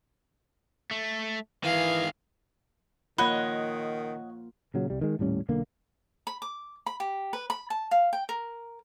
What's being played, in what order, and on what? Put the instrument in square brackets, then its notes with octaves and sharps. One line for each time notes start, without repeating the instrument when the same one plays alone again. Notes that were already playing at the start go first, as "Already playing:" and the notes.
[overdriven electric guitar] A3
[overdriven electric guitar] D#3 G#4 [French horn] E3 [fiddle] F5
[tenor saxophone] D#3 [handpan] A#3 F4 [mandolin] C#5 D#5 F#5 [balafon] B5
[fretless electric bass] A#2 C#3 F#3
C2 G3
D#3 G#3
D#1 A2 G3 C#4
B1 D3 A#3
[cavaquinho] B5
D6
B5
G4
B4
B5
A5
F5
G5
A#4